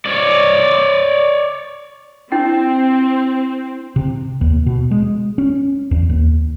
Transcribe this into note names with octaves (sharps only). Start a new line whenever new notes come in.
C#5 D5
C4 D4 E4 G5
C3
D#2
B2
G#3
C#4
E2
D#2